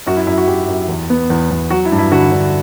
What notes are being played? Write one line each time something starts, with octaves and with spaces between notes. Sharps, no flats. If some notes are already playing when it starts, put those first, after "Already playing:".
F#2 F#4
E4
F#2 E4
F#4
F#2 G4
F#2
E2
B3
E2
E2
F#3 F#4
E4
G2
E4
D3 F#4
D3